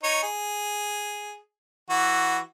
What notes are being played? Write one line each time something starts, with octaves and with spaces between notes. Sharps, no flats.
D#4 C#5
G#4
E3 F#4